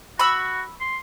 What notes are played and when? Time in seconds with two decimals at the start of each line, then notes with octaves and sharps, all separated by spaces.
0.19 F#4 B5 C#6 E6
0.81 C6